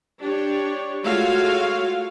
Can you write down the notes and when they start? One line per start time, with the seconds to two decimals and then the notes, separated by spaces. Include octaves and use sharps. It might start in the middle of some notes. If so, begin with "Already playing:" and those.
0.21 D4 G4 C#5
1.04 G#3 A3 F4 F#4 C#5 F5